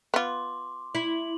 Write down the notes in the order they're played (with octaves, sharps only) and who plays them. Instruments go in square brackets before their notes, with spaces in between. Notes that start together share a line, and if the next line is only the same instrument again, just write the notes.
[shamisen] B3 F4 [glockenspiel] C6 D6
[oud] E4 [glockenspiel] F#7